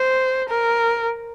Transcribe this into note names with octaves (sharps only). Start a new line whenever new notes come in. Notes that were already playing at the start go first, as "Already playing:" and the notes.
Already playing: C5
A#4